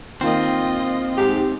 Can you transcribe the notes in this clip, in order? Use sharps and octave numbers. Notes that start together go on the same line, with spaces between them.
D#3 A#3 C4 F4 D#5
G#2 G4